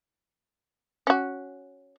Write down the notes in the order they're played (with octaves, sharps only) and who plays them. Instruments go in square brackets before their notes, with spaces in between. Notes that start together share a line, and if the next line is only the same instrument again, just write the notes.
[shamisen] C#4 F#4